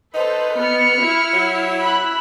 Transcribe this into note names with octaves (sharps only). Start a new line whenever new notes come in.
D#4 A4 B4 C5
B3 B5 F6 C#7
E4
F#3
B5 E6 F#6